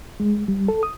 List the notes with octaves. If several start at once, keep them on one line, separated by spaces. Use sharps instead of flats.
G#3
G3
A4
D#6